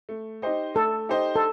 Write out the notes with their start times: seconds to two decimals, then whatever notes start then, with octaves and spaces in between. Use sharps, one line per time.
0.09 A3
0.42 D#4 G4 C5 D#5
0.75 A3 A4
1.09 D#4 G4 C5 D#5
1.36 A4